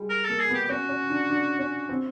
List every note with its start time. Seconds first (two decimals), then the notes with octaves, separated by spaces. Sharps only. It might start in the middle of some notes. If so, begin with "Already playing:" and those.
Already playing: G3 G#3
0.09 A#4
0.24 A#3 A4
0.39 G#4
0.49 B3 G4
0.64 G4
0.69 C#4 F#4
0.89 C#4
1.09 D4
1.30 D4
1.59 C#4
1.89 C4